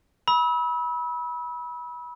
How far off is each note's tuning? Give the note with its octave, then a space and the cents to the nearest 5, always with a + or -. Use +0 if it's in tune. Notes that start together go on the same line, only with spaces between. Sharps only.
B5 -25 E6 -35